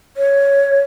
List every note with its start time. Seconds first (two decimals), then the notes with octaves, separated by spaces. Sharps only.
0.17 C#5